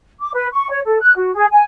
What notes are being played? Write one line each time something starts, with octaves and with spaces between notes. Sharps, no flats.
D6
B4
C#6
C#5
A4
F#6
F#4
G#4
G#5